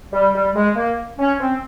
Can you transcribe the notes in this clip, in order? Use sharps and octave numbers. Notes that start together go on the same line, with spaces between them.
G3
G3
G#3
A#3
C#4
C4